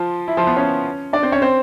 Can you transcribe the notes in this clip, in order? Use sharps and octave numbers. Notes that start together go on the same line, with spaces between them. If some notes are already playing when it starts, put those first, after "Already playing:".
Already playing: F3 F4
E4
F3 F4
B3 B4
C#4 C#5
D4 D5
C4 C5
C#4 C#5
C4 C5